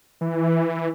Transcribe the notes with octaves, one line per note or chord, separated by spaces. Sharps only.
E3